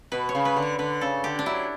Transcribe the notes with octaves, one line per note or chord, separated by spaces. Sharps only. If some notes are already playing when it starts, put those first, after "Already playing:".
B2 B4
C#5
C#3
B4
D3
C#5
D3 B4
C#3 A4
D3 G4
D4
F#3 E4